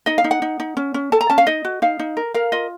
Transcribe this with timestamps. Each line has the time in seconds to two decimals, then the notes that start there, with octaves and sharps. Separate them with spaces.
0.06 D#4 D#5
0.18 F5
0.24 D#4
0.31 F#5
0.42 D#4
0.60 D#4
0.77 C#4
0.94 C#4
1.12 A4 A5
1.21 A#5
1.30 C#4 A5
1.38 F5
1.47 D#4 D#5
1.65 F#4
1.82 D#4 F5
1.99 D#4
2.17 A#4
2.34 A#4 F5
2.52 F4 D#5